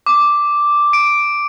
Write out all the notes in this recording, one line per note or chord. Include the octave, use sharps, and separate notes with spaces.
D6
D7